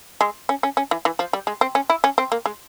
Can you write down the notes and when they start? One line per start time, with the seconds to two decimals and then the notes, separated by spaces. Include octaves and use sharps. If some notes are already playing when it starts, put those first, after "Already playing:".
0.21 G#3
0.49 C#4
0.63 C#4
0.77 C#4
0.91 E3
1.05 E3
1.19 F3
1.33 G3
1.47 G#3
1.61 C4
1.75 C#4
1.90 E4
2.04 C#4
2.18 C4
2.32 A#3
2.46 G#3